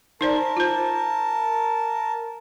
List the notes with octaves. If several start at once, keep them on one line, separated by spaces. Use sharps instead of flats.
D#4 A#4 C5 D5 A5
F4 C5